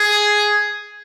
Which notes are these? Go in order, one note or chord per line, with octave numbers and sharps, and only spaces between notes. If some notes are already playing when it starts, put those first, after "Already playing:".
Already playing: G#4